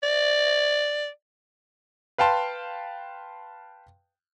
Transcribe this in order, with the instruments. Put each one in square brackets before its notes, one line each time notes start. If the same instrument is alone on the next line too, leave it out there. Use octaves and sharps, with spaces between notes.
[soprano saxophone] D5
[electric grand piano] B4 F5 G5 A5 C6